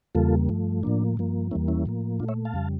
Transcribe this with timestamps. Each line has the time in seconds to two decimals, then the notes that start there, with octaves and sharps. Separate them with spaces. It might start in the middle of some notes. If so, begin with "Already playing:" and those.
0.15 E2 C#3 G3 A#3 F4 A4
0.49 G2 F3 A3
0.83 A2 F3 A#3 D4
1.17 G2 F3 A#3
1.51 E2 E3 G3 A#3 C#4 E4
1.68 C#4 E4
1.86 A2 F3 A#3
2.20 A#2 A3 D4 F4
2.28 C#5 E5
2.45 F5 A5
2.54 F2 C#3 G3